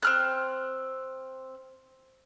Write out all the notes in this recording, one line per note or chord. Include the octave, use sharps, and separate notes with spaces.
C4 F6 F#6